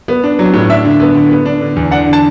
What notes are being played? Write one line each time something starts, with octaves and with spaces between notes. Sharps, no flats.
B3
D4
F#3
A2
D4 E5
D3
B3
D3
B3
D4
D3
E2
D4 F#5
D3
A5